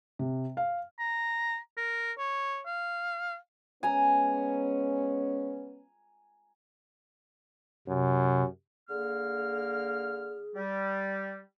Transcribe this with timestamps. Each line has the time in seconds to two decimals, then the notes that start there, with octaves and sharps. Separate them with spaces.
0.19 C3
0.57 F5
0.99 A#5
1.77 A#4
2.19 C#5
2.66 F5
3.83 G#3 B3 C#4 G#5 A#5
7.88 F#2 C3
8.90 D3 A#3 G#4 F6
10.56 G3